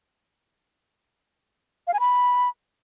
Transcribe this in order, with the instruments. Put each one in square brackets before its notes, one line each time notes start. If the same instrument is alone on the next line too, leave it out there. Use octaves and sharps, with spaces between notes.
[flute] F5
G#5
B5